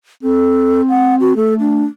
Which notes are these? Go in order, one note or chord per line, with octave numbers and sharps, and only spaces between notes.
C4 A4
F#5
F#4
A3 A4
D4